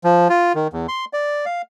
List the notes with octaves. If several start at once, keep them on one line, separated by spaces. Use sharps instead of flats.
F3
F4
D#3
E2
C6
D5
F5